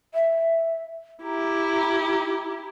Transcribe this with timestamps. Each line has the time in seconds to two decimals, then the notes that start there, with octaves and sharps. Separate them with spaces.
0.14 E5
1.23 E4 G4 A#5